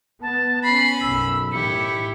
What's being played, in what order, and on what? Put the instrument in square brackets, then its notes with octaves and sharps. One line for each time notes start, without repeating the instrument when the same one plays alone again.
[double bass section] B3 [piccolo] A5
[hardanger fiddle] C#4 B5 [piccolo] C7
[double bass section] B1 F#2 [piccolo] E6
[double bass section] A2 D#3 [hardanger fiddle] E4 G4 [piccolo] C#7